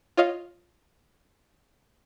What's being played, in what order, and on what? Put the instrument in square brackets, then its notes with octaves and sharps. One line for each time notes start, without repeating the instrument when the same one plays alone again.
[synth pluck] F4 C#5 D#5 F5